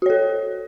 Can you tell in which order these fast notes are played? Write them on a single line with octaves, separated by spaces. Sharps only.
F#4 C#5 A4